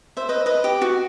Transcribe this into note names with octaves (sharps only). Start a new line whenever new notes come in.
C5 E5
B4 D#5
B4 D#5
G4
F#4